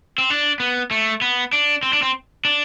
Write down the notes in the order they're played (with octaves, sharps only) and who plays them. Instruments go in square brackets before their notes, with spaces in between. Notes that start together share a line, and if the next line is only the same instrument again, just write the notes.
[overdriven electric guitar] C4
D4
B3
A3
B3
D4
C4
D4
C4
D4